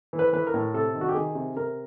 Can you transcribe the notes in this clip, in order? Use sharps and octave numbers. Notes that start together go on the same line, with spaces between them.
E3
B4
E3 B4
A#4
A2
C3 A4
D#3
F#4
G4
D#3 G#4
C3
C3 A#4